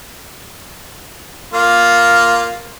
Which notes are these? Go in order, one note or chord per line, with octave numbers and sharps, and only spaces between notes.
A#3 F4